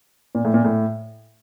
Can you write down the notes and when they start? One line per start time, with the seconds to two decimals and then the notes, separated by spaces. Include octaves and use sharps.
0.35 A#2
0.45 A2
0.54 A#2
0.65 A2